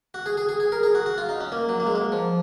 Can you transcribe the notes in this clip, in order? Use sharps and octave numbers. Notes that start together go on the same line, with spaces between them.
F#4
G#4
G#4
G#4
G#4
A#4
G#4
F#4
F#4
F4
D#4
C#4
A#3
F#3
A#3
G#3
A#3
F3